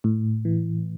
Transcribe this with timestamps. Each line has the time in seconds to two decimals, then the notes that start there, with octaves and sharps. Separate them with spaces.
0.04 A2
0.45 E3